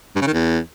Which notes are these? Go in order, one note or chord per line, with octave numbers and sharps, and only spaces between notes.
G2
C#3
D#3
E2